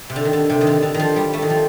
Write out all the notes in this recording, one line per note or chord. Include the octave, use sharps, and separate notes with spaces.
C3
D3
D#3
D3
C3
D#3
D3
D3
D#3
F3
G3
A3
D#3
F3